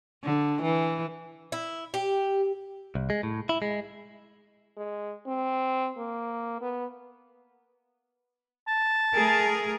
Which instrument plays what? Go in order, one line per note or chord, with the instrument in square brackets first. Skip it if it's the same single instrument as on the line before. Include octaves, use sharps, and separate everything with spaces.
[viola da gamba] D3
E3
[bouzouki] E4
G4
[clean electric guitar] C2
G#3
A2
E4
G#3
[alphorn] G#3
C4
A#3
B3
[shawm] A5
[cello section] A3 G#4 A#4